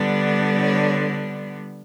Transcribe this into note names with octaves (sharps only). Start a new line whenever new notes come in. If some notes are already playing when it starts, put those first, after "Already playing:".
Already playing: D3 G3 B3 D4
C#5